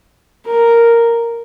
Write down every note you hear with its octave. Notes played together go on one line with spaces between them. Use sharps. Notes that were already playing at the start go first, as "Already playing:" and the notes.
A#4